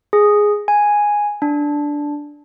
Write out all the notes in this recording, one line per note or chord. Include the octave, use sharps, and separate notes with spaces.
G#4
G#5
D4